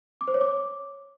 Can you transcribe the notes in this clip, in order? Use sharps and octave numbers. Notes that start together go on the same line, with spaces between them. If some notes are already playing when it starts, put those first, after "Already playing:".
D6
C5
C#5
D6